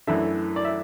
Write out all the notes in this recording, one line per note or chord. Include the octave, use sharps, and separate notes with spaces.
F#2 E3 A3 D4 E5
D5
E5